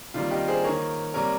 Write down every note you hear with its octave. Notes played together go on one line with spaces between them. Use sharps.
C3 D#3 G3 A#3 F4
D#4 G4
G#4 C5
D#3 A#3 A#4 C#5
C3 G3 A#3 A#4 C#5